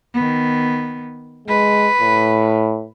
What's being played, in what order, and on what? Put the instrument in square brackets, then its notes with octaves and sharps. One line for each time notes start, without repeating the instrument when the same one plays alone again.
[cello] D#3 B3
[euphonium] G#3 [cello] B4
[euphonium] A2